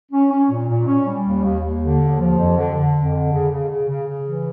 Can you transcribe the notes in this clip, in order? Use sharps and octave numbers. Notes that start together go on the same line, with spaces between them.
C#4
C#4
A#2
A#2
C#4
G3
D#2
D#2
D#2
D3
D#2
F3
F2
D3
D3
F2
D3
C#3
C#3
C#3
C#3
C#3
E3